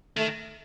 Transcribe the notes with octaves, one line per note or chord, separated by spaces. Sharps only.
D#3 A3